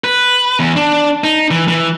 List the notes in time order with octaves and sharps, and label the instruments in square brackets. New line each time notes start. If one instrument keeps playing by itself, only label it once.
[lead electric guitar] B4
E2
D4
D#4
E3
E3